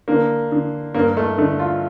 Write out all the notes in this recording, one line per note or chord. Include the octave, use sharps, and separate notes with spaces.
D3 A#3
D3
G2 A#3
A3
D3 A3
F4